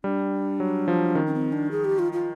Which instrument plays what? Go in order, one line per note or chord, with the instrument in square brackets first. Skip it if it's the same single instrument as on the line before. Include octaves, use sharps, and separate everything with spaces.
[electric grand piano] G3 [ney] D4
[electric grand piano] F#3
F3
[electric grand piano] D#3 [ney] C#4
[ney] C#4
C4
D4
G#4
G4
F4
F4